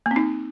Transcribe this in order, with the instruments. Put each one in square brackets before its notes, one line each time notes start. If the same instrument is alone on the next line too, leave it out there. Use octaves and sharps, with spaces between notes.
[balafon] A#3
C4
D#4